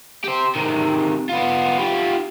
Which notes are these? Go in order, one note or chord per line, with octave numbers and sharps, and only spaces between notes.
G4 C5
C3 D#3
B3 F4
F4 G4